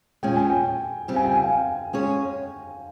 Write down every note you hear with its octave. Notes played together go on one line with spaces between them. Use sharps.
A#2 G#3 C#4 G5
G#5
G5
C#3 G3 C4 F4
G#5
G5
G#5
F5
G5
G#3 C#4 G#4 C#5